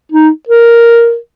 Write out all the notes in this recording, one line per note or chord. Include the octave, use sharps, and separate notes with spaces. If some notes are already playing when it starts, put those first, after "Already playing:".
D#4
A#4